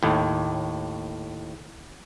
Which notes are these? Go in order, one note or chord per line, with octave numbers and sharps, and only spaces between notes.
D#2 A2